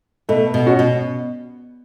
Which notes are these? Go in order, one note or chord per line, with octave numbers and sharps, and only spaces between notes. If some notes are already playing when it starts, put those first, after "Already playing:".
B2 A3
B2
C#4 F#4
B2